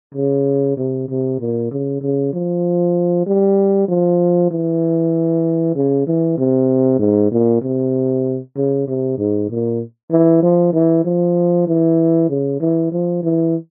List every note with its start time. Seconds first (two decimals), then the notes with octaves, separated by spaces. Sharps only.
0.15 C#3
0.77 C3
1.09 C3
1.39 A#2
1.71 C#3
2.01 C#3
2.33 F3
3.26 G3
3.88 F3
4.51 E3
5.76 C#3
6.07 E3
6.37 C3
6.99 G#2
7.32 A#2
7.62 C3
8.56 C#3
8.87 C3
9.18 G#2
9.50 A#2
10.11 E3
10.42 F3
10.73 E3
11.05 F3
11.67 E3
12.29 C#3
12.60 E3
12.92 F3
13.23 E3